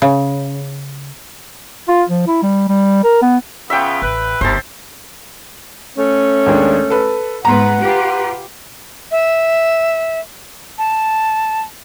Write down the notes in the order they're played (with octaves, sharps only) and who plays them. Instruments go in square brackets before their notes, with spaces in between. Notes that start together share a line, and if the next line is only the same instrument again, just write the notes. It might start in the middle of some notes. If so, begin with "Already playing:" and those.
[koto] C#3
[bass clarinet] F4
F3
E4
G3
G3
A#4
B3
[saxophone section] C#3 B3 F4 [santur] E5 G5
[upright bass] A1 [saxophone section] B4
[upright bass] G1 [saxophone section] D#2 C3 [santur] C5 A5
[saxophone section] A3 C#4
[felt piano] D#2 G#3 D4
A4 B4
[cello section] G#2 B3 B4 [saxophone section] F#5 [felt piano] A#5 C6
[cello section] F4 G4 B4
[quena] E5
A5